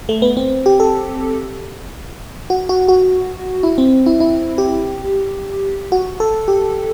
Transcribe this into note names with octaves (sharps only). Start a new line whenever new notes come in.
A3
B3
C4
G4
A4
F#4
F#4
F#4
E4
C4
E4
E4
G4
F#4
A4
G4